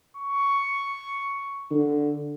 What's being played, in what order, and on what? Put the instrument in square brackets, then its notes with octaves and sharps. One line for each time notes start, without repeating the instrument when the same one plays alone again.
[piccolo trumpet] C#6
[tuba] D3